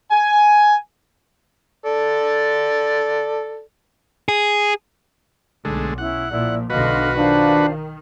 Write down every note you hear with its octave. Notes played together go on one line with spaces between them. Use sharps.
G#5
A4 D5
G#4
B1 D3 G#3 A3
C#4 E4 F#5
A#2 F3 E4 D5
B1 B2 D3 F#4 B4 D#5 F5 F6
D#3 D4 F4 C5 F5